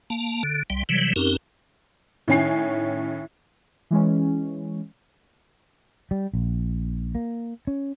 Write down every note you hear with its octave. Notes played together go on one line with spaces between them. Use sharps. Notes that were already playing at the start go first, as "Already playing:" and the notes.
A#3 A5
D3
C2 G3
C3 E3 F#3 G3
F#2 C4 C#4 D#4 G4 A#4
A2 D#3 C#4 G#5 C7
E3 G#3 C#4
G3
A#1
A#3
C#4